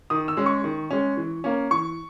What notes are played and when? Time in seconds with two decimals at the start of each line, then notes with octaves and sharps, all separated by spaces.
0.10 D#3 D#6
0.28 E6
0.37 G#3 C#4
0.46 C#6
0.64 D#3
0.91 G#3 C#4
1.17 E3
1.44 A#3 C#4
1.71 E3 C#6